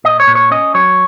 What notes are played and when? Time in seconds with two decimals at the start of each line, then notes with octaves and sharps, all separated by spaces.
0.04 A#2 D#5
0.20 C#5
0.28 A#2
0.35 C#5
0.51 C#4 D#5
0.74 F#3 C#5